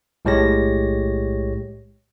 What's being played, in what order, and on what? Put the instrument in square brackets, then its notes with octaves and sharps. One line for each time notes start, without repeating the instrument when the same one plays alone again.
[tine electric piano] B1 A2 G#3 G4 C#5 A#6